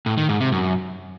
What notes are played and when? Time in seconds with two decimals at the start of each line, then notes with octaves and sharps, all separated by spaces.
0.06 A2
0.18 D#3
0.29 G#2
0.40 C3
0.52 F#2